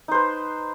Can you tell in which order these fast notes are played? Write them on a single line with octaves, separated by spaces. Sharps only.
D#4 C5 B4